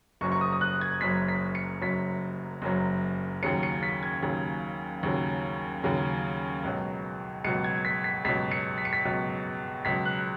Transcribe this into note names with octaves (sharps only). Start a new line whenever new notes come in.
F#1 F#2 F#3 C#6
C#6
D#6
D#6
F#6
G#6
F#1 F#2 F#3 B6
B6
C#7
F#1 F#2 F#3 B6
F#1 F#2 F#3
D#2 C#3 F#3 C#7
C#7
B6
G#6
D#2 C#3 F#3
D#2 C#3 F#3
D#2 C#3 F#3
C#2 B2 F#3
C#2 B2 F#3 C#7
G#6
B6
B6
C#2 B2 F#3 B6
C#7
B6
C#7
B6
C#2 B2 F#3
C#2 B2 F#3 B6
F#6